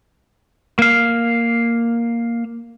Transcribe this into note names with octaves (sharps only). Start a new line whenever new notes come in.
A#3 F5